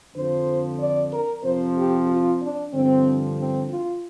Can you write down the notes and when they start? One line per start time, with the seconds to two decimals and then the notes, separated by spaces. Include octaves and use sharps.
0.15 F2 D3 F3 C5
0.80 D5
1.11 A#4
1.44 F2 C3 F3 C5
1.77 G4
2.08 F4
2.41 D4
2.73 G2 D3 F3 C4
3.38 C4
3.70 F4